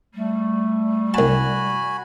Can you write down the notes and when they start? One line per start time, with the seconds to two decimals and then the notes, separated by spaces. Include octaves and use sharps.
0.14 G3 A3
1.14 C2 F#4 G#5 A5 B5